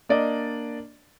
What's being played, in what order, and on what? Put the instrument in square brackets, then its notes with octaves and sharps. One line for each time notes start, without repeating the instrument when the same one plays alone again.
[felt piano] A#3 D4 D5 D#5